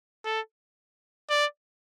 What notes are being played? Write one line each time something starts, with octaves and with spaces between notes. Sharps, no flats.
A4
D5